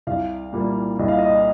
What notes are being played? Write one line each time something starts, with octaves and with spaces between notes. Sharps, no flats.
C2 F5
A#2 G3 A#3
C2 D#5
F5
D#5